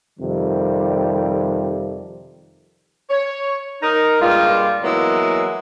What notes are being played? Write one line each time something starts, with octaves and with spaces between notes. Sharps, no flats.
F2 C3 D#3 G3
C#5
D#4 A#4
G2 A#2 G3 G#3 F4
E3 F#3 G#3 A#3 B3 E4